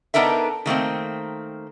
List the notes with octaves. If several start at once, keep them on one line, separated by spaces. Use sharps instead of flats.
B3 D4 D#4 A4 A#4 E5
D#3 A3 A#3 C4